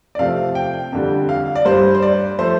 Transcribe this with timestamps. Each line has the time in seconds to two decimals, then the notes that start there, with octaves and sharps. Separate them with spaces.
0.15 D5
0.19 C3 F3 A3 F5
0.55 G5
0.92 F2 D3 G3
1.29 F5
1.56 D5
1.65 G2 G3 C5
1.95 C5
2.02 D5
2.39 F3 A3 C5